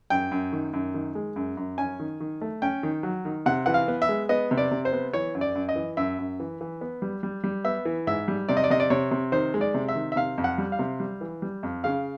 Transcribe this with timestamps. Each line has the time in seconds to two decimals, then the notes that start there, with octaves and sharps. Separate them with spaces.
0.10 F#2 G5
0.31 F#2
0.53 D#3
0.73 F#2
0.94 D#3
1.15 G#3
1.36 F#2
1.57 F#2
1.78 C#4 G#5
2.00 D#3
2.20 D#3
2.41 A3
2.62 C#4 G5
2.83 D#3
3.03 F#3
3.25 D#3
3.46 C3 F#5
3.66 E3 F#5
3.74 F5
3.88 B3
4.02 E5
4.09 G#3
4.29 B3 D#5
4.51 C3
4.58 D5
4.71 C3
4.85 C5
4.92 B3
5.13 E3 C#5
5.35 F#2
5.41 D5
5.55 F#2
5.69 D#5
5.76 E3
5.97 F#2 E5
6.19 F#2
6.40 E3
6.61 E3
6.81 B3
7.02 G3
7.23 G3
7.44 G3
7.65 B3 E5
7.85 E3
8.07 G#2 E5
8.28 G3
8.49 C3 D5
8.57 D#5
8.64 D5
8.70 C3 D#5
8.80 D5
8.90 C3 C#5
9.11 C3
9.32 D#3 C5
9.54 G#3
9.61 D5
9.74 C3
9.88 E5
9.95 D#3
10.12 E5
10.16 C3 F5
10.38 F2
10.44 F#5
10.58 G3
10.72 F5
10.79 C3
11.00 G3
11.21 E3
11.42 G3
11.63 F2
11.84 C#3 F5